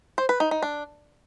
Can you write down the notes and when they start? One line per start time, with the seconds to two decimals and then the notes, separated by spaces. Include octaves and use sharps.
0.18 C5
0.29 B4
0.40 D#4
0.51 D#4
0.62 D4